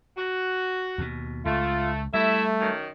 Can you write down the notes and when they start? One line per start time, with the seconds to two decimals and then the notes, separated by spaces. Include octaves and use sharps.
0.17 F#4
0.98 D#2 B2
1.46 C#2 A3 F4
2.14 G3 A3 E4 E5
2.60 F#2 D#3